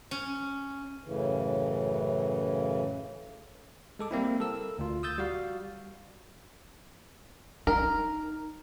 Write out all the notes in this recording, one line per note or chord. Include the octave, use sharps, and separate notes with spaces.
C#4
F#2 A2 C#3 E3
G#3 A4 D6
G3 A#3 C4 E4
A4 A#4 E6
D2 F4
D#6 E6 G6 A6
G3 F#4 F5
D#4 A#4